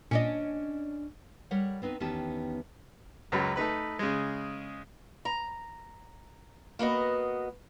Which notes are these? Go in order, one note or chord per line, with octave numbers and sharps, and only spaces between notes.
A#2 C#4 D4 D#5
G3 A#4 C#5 F#5
B3 C4 D#4 B4
E2 D#3 B3 C#4 G4 A5
C#2 F#2 F#3 B4
A3 D#4 B4 B5
C#3 G#3
A#5
A#3 B3 F#4 D#5